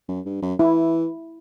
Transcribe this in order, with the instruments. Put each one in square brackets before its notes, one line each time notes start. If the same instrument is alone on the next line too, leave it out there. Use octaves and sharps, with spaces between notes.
[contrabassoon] F#2
G2
F#2
[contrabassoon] E3 [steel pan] E4